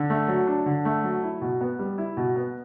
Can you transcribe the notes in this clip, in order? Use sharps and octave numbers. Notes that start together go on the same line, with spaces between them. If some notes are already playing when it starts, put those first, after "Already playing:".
Already playing: D3
A3
F#3
D4
D3
A3
F#3
E4
B2
B3
G3
E4
B2
B3